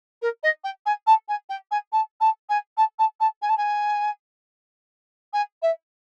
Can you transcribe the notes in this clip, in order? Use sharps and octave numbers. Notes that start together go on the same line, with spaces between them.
A#4
D#5
G5
G#5
A5
G#5
G5
G#5
A5
A5
G#5
A5
A5
A5
G#5
A5
G#5
G#5
E5